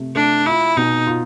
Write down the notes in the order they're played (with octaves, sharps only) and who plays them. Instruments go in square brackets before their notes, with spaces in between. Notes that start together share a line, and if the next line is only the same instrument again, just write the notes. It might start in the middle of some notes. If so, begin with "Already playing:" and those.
Already playing: [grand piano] C3 A3
[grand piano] A3 [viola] D4
[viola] E4 [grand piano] F4
[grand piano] B2 [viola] D#4
[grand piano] F4